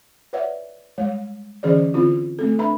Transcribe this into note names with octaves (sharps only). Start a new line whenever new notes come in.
B4 C#5 D5 E5 F#5
G3 G#3 C#5
D3 E3 C#4 G#4 C5 D5
D3 C4 E4 F4
A3 C4 A4
D4 B4 E5 A#5 B5